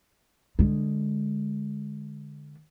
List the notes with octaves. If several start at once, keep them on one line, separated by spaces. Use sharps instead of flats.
D3 G#3